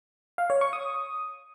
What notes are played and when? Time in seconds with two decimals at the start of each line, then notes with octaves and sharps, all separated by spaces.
0.38 F5
0.50 C#5
0.61 C#6
0.73 D#6